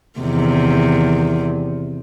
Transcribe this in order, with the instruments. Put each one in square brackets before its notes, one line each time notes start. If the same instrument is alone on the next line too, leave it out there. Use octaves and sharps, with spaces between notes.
[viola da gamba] E2 C3 D#3